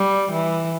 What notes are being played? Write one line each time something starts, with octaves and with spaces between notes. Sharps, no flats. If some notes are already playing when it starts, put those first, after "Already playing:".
Already playing: G3
E3